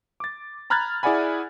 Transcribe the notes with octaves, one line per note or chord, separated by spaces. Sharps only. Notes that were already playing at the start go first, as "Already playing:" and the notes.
D6 A6
A#5 B5 F6 F#6 G#6 A6
E4 G#4 D5 F#5 G#5 B5